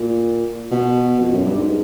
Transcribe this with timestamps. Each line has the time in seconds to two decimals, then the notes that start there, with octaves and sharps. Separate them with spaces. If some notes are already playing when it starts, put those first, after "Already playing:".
Already playing: A#2
0.71 B2
1.20 F2
1.32 F#2
1.45 G2
1.57 G#2